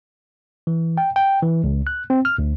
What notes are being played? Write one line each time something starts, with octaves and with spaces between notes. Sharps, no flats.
E3
G5
G5
E3
C#2
F#6
C4
F6
D2